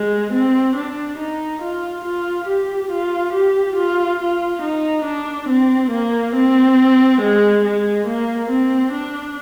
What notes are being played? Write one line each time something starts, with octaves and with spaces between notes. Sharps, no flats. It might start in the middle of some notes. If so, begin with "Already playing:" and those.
Already playing: G#3
C4
D4
D#4
F4
F4
G4
F4
G4
F4
F4
D#4
D4
C4
A#3
C4
G#3
G#3
A#3
C4
D4